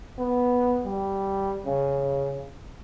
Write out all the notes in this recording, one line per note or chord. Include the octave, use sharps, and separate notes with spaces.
B3
G3
C#3